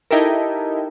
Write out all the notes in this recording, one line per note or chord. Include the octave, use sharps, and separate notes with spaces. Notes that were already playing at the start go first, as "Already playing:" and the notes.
D#4 E4 G4 A4 A#4